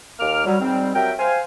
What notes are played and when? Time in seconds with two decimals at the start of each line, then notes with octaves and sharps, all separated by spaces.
0.19 D#2 A#3 D6 F6
0.46 F#3 G3
0.61 G#2 G3 C4
0.94 F#3 G4 A#4 E5 G5
1.19 C5 F5 G#5